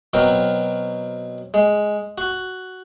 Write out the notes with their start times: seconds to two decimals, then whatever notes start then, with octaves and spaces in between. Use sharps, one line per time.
0.14 B2 F#3 C4 A#4
1.54 G#3
2.18 F#4